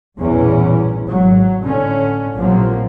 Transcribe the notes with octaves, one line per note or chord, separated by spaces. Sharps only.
A#1 E2 G2 B2 E3 C#4
G#1 F#3
A2 D3 C#4
A#1 A2 C3 F3 F#3 A#3